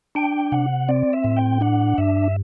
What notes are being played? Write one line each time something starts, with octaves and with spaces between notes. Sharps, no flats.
D4 G5
C3 F#5
C4 D5
E5
A2
G5
D4 F#5
G2 E5